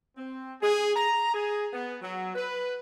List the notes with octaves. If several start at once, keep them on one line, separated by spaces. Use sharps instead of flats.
C4
G#4
A#5
G#4
B3
F#3
B4